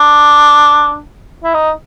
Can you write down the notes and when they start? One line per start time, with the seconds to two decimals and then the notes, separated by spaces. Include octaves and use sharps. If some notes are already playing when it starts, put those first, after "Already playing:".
Already playing: D4
1.44 E4
1.54 D#4